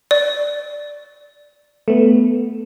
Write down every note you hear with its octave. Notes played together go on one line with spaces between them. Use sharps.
D5
A3 B3